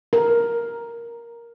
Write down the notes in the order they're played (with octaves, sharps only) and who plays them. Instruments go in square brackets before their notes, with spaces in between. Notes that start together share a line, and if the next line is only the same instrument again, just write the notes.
[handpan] A#4